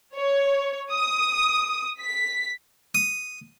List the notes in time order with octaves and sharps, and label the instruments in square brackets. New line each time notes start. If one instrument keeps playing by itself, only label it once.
[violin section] C#5
D#6
B6
[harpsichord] D#6